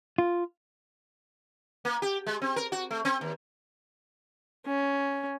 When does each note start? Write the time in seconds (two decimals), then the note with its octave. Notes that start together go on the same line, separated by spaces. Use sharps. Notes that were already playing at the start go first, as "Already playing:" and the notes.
0.18 F4
1.85 A#3
2.02 G4
2.27 G#3
2.42 C4
2.56 A#4
2.72 F#4
2.91 A3
3.05 C4
3.21 D#2
4.66 C#4